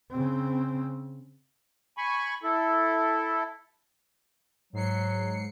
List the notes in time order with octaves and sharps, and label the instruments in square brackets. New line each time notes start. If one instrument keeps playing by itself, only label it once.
[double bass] C#3 C4
[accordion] G#5 B5 C#6
E4 A4
[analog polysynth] G#2 C7 C#7 [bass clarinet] F#3